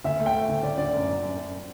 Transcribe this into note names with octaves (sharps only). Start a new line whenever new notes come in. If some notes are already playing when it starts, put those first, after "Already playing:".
D2 E5
A3
G5
A3
D2
D2 D5
D3 D5
F#2
F#3
F#2
F#2